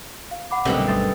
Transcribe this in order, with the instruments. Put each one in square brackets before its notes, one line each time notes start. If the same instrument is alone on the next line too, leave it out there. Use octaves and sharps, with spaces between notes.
[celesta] F5
F#5 B5 D6
[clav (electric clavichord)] C2 A3 C4 [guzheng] F#2 B2 D3 [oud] G3 [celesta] F#7
[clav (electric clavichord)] G1 A3 C5 [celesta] D#6 A6